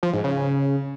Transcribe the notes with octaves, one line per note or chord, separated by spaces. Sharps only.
F3
G#2
C#3